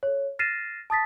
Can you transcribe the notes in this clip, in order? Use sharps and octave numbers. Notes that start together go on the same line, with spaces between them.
A4 C#5
F6 A6 A#6 C7 D#7 E7
A5 D#6 A6 B6